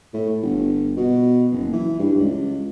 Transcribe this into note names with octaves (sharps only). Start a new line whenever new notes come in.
A2
G1
B2
F#1
E3
G2
C#2